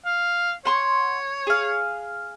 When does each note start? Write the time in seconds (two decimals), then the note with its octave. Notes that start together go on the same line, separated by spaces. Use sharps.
0.06 F5
0.65 C#5 F#5 C6 C#6
1.47 G#4 F5